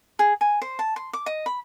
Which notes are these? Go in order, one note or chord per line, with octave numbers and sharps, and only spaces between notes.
G#4
G#5
C5
A5
C6
D6
D#5
B5